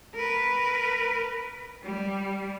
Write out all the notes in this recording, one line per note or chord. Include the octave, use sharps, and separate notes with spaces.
A#4 B4
G3